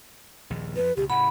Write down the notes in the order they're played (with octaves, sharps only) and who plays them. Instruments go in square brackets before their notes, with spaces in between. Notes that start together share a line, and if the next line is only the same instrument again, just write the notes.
[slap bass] A#1 D#2
[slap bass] F2 F3 [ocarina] B4
[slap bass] C#2 B2 [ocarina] G4
[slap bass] A2 C#3 [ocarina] F#5 [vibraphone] B5